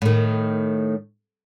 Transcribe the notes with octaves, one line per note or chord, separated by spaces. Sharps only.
A2 D#3